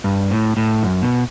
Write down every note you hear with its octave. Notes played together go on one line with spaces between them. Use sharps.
G2
A2
A2
F#2
B2